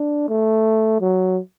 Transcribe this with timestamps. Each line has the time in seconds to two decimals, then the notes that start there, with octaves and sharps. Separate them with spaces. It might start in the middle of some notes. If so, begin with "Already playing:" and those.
Already playing: D4
0.29 A3
1.01 F#3